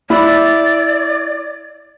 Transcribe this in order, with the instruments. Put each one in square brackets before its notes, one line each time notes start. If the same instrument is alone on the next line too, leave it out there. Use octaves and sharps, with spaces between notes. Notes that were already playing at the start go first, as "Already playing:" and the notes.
[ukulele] E4 [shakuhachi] D5